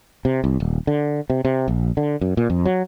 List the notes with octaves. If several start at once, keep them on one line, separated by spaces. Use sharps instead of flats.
C3
C2
D#1
D3
C3
C3
A#1
D3
F#2
A#2
F2
F#3